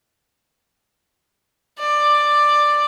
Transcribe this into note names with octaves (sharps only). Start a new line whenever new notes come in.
D5